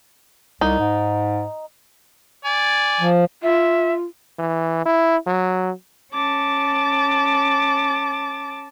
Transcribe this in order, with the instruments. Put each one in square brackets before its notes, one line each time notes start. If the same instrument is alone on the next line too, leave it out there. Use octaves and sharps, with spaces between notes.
[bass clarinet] C2 [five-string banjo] D#4
[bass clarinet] G#2
[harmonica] D5 G#5
[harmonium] F3
[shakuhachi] F4 [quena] E5
[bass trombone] E3
E4
F#3
[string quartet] C#4 A5 D6 A6